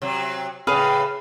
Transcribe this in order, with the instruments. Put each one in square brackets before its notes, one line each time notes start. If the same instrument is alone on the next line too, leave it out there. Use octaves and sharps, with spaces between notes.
[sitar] C3 F#3
[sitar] A2 C#3 [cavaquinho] G#4 B4 F5